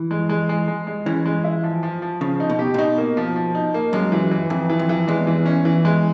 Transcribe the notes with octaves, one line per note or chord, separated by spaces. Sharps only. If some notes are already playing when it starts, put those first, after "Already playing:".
Already playing: E3
G#3
G#3
G#3
G#3
G#3
E3 C#4
G#3
E4
F3
F3
F3
C#3 F3
D#4
B2
G4
A#2
B2 D#4
A#3
F3
F3
D#4
A#3
F#2 G#3
E3
E3
F2 E3
E3
F2
E3
E2 G#3
E3
C#4
E3
G#3